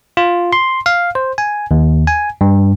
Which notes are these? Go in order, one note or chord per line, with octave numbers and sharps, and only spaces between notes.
F4
C6
F5
C5
G#5
D#2
G#5
G2